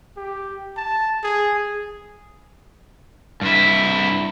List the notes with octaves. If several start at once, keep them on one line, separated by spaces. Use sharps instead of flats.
G4
A5
G#4
G2 E4